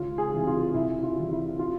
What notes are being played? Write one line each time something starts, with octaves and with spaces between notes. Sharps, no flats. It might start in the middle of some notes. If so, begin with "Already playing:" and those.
Already playing: C#2 F4
G#4
C3 E3 G3
F4
C2 E4
F4
C3 E3 G3
E4
F4